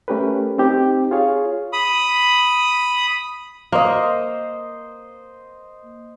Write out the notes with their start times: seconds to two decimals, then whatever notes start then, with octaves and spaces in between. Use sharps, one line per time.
0.08 A3 C#4 G4 A#4 B4
0.58 C4 D#4 G4
1.11 F4 G#4 C#5 F5
1.73 B5 D#6
3.72 A#3 C5 D#5